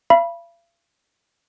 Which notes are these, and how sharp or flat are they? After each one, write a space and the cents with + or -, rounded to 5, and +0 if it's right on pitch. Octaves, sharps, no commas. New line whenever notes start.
F5 -45 B5 -20